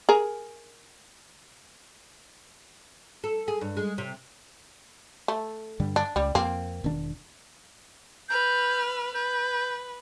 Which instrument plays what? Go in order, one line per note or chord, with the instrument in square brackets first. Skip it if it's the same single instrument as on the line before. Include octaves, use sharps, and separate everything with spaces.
[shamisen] G#4 A#4
[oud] A4
G#4
G2
G#3
C3
[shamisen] A3
[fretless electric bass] G2 D3 G3
[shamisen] D4
[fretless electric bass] C#2 [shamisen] G3
[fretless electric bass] F2 [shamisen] A#3 C4
[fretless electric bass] E1 D#3 D4
[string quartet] B4 F6 [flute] G6
[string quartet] B4 [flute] G6